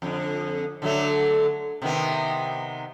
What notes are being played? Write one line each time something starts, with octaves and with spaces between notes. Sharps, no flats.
F2 D3
D3 F#3 A3
C3 D#3 B3